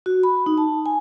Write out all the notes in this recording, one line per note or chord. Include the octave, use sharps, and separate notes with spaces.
F#4
B5
D#4
A5
G#5